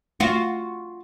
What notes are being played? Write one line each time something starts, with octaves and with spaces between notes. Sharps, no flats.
F4 F#4